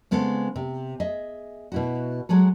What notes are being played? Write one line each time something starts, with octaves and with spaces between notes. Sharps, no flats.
C#3 G#3 B3 C4 A4
C3
G#4 D#5 E5
B2 E4 F#4
F#3 G#3 G#4 A4